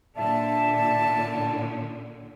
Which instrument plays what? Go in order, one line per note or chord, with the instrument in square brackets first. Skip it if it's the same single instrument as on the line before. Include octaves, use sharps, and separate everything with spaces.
[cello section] A#2 D3 [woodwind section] D5 E5 A5